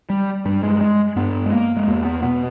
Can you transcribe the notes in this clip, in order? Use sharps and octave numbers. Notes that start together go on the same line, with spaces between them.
G3
G2 G3
G#3
G#3
G2 B3
G#3
A#3
G#3
E2 A#3
B3
B2 B3